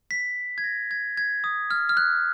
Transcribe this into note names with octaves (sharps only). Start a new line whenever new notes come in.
B6
G#6
A#6
G#6
G#6
D#6
F6
F6
F#6